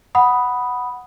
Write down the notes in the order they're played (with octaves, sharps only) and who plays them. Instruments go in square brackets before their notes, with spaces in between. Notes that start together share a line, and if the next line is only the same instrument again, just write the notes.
[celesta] F#5 B5 D#6